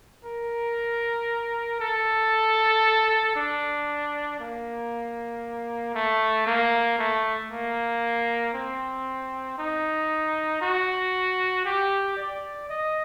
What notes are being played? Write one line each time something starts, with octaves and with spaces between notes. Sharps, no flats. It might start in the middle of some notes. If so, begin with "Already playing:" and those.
A#4
A4
D4
A#3
A3
A#3
A3
A#3
C4
D#4
F#4
G4
D5
D#5